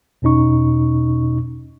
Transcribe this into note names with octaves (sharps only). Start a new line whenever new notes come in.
E2 B2 C#4 D#4 C#6